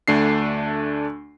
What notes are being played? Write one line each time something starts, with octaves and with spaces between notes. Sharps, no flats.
D2 A3 D4 C7